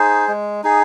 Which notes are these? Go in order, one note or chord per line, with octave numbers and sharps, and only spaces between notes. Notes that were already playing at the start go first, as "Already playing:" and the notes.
Already playing: D#4 G#4 C5
G#3
D#4 G#4